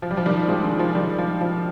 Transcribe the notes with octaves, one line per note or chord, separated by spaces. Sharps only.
F3
G3
F3
D#3 G3
F3 G#3
D#3
F3
D#3 G3
F3
F3